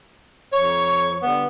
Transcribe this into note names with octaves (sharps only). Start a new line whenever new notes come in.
F2 C#5 C#6
D3 G3 B3